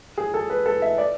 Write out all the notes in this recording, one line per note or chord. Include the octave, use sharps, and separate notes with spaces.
G#4
A4
B4
A4
E5
D5